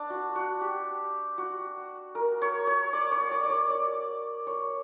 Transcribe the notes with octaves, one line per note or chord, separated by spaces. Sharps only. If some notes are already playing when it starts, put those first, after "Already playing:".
Already playing: D4
F#4
F#4
G4
F#4
A#4
C#5
C#5
D5
C#5
D5
D5
C#5
D5
C#5